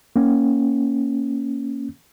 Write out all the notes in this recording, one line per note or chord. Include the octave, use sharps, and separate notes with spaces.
A#3 C#4